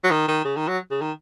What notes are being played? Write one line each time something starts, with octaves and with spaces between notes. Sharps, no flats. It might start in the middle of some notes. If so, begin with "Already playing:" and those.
F#3
D#3
D#3
C#3
D#3
F#3
C#3
D#3